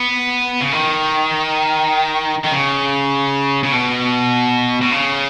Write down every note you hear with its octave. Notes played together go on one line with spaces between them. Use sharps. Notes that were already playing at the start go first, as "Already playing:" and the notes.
Already playing: B3
C#3
D#3
D#3
C#3
C#3
B2
B2
C#3